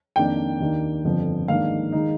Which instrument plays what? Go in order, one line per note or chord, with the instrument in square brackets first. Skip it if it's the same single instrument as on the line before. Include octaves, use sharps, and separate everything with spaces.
[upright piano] F2 D#3 A#3 D4 G5
D#2 D#3 A#3 D4
G1 F2 D3 F3
G#2 D#3 A#3 D4 F5
D#3 G#3 D#4